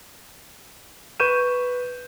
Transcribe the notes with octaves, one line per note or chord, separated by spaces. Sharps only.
B4 C#6 G6 D#7 E7